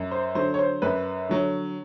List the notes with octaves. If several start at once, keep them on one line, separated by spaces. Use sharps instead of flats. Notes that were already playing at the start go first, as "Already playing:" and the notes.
Already playing: F#2
C5
D3 F#3 C5
C#5
C5
F#2 B4
D3 F#3